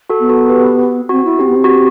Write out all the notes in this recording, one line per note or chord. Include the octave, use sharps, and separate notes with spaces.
F#4 A4
B3
F#4 A4
G4 B4
C4 F#4
E4
C4 G4
B3
C4
F#4
G4